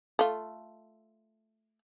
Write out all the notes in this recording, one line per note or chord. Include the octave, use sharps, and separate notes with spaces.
A3 F4